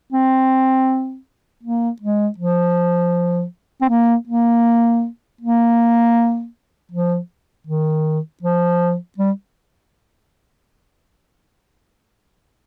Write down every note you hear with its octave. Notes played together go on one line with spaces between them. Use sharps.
C4
A#3
G#3
F3
C4
A#3
A#3
A#3
F3
D#3
F3
G3